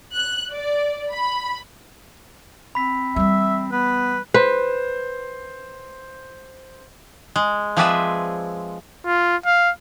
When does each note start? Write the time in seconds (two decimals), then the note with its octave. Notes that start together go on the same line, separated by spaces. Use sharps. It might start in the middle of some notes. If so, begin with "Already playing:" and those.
0.17 F#6
0.53 D5
1.12 B5
2.75 C4 B5 B6
3.16 E3 G3 E5
3.72 B3 B4
4.34 B4 C5
7.36 G#3
7.77 F3 C4 G#4 B4 D5 E5
9.06 F4
9.46 F5